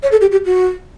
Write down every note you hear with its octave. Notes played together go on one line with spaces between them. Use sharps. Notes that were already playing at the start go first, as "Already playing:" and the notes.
C#5
A4
G4
G4
F#4